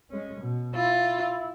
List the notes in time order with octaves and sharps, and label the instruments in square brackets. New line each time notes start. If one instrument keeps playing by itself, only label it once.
[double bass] G#3 C#4
B2
[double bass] E4 [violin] F4